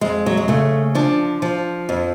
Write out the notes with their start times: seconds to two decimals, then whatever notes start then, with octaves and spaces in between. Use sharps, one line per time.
0.01 F2 G#3
0.26 F#3
0.37 G#3
0.48 C#3 A3
0.95 F3 D4
1.42 F3
1.89 F2